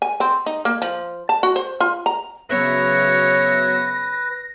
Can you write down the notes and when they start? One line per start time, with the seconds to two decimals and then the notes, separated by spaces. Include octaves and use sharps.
0.02 G#5
0.20 C4
0.46 D#4
0.65 A#3
0.82 F3
1.29 A5
1.43 F#4
1.56 C5
1.80 F4
2.06 A#5
2.50 C#3 F#3 B3 B4 C#5 E5 A#6